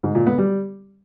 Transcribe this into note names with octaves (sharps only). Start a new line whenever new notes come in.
G#2
A#2
B3
G3